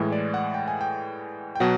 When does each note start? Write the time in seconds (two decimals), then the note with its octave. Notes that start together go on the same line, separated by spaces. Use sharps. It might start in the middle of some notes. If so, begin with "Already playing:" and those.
Already playing: A2 E3 G#3
0.12 D5
0.34 F#5
0.54 G5
0.68 G#5
0.81 G5
1.55 G5
1.60 B2 F#3 F#5